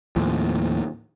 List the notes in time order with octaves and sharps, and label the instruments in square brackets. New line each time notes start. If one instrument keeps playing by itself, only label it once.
[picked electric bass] D#2 A2 F3